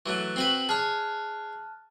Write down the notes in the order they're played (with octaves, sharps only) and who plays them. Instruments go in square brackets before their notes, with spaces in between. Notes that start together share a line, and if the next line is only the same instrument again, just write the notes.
[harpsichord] E3 F#3 A3 [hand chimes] C#6 F#6
[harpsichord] C4 F#4 B4
[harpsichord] G#4 C#5 [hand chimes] A5 F6 F#6